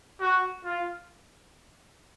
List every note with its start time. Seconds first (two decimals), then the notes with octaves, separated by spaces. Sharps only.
0.21 F#4
0.65 F4